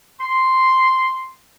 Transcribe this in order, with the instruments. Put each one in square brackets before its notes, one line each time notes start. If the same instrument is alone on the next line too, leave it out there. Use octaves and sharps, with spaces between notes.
[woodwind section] C6